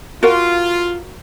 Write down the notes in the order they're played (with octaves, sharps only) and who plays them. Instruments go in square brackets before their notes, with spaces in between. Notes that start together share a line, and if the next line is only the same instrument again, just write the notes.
[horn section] F4 [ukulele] F#4 A#4 F5